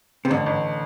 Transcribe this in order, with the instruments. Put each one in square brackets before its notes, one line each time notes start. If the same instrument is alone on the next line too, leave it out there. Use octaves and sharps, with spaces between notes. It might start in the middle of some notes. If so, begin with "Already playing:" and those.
[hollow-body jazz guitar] C3
[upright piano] A1 [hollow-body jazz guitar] D3
[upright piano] A1